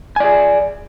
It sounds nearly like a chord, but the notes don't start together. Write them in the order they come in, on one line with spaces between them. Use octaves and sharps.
G#5 D5 G#4